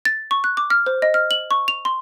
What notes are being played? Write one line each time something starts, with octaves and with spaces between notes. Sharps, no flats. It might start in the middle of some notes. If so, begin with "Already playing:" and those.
A6
C#6
F#6
D6
F6
C5
D#5
F6
F#7
C#6
F7
C6